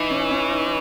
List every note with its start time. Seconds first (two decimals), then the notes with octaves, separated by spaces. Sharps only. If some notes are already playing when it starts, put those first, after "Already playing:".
Already playing: E3 D#4
0.10 C#4
0.31 C#4
0.51 D#4